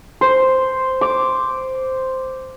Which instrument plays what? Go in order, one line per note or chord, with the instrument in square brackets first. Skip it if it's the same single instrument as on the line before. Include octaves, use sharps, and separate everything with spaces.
[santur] C5
D6